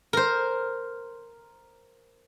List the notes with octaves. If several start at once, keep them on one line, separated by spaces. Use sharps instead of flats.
A#4 C5